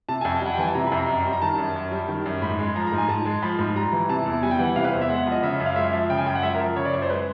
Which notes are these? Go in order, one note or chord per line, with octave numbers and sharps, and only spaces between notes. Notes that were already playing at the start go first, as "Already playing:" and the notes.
C3 A5
F2 G#5
A5
G3 F#5
G5
E3 G#5
A5
C3 A#5
B5
F2
A#5
F#2
G3
A#5
D#3 A5
F#2
F#2
G3
D#3
F#2
G#2 B5
G#3
F3 A#5
A#5
G#2
G#5
G#2 A5
G#3
F3 B5
G#2
G3 A#5
E3
C3 A5
E2
G3 G#5
G5
E3 F#5
C3 F5
B4
E2 C5
E5
G#3 F#5
F3
D#5
C#3 E5
F#2
F5
G#3 E5
F3
C#3 G5
G#5
F#2 G5
F#5
G#3 E5
A#4
F3
C#3 C#5
D5
F#2 C#5
C5
G#3 B4